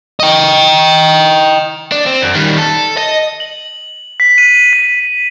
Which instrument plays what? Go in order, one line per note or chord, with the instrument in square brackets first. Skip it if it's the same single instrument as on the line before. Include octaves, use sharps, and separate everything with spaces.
[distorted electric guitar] D#5 G5
[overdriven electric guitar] D4
C4
F#2
D#3 G3
A4
D#5
[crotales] F#7
B6
D#7
B6